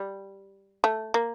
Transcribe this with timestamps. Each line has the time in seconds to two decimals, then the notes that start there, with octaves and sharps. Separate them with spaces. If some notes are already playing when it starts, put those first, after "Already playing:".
Already playing: G3
0.84 A3
1.14 A#3